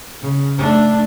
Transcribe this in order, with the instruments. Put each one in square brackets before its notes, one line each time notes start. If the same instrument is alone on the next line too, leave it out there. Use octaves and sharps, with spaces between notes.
[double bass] C#3
A3 D4